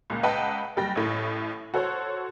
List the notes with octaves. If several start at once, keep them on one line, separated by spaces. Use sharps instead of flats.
C#2 A#2
C#2 B4 D#5 F#5 G5 A5
F#1 G3 G5 A#6
A1 A2
F#4 A4 C5 C#5